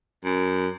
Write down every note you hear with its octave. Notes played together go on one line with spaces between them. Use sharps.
F#2